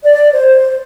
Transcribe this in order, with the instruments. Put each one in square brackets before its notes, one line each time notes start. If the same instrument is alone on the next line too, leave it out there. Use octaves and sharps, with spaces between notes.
[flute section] D5
C5